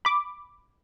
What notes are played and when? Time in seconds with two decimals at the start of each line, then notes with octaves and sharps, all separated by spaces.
0.05 B5 D6